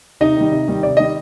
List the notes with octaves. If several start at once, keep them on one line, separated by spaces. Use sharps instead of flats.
C3 D#4 D#5
D#3 G3
C3
D#3 G3
C3 D5
D#3 G3 D#5